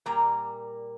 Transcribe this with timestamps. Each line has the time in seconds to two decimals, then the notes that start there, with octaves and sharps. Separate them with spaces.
0.06 A#2 G3 A#3 A#5